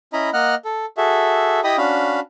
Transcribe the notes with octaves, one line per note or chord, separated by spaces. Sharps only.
C#4 E4 D#5 A#5 B5
A#3 D#5 F#5 F6 F#6
A4
F#4 G#4 A4 E5
E4 G4 D#5 G5 B5 D#6
C#4 D4 F#4 F5 B5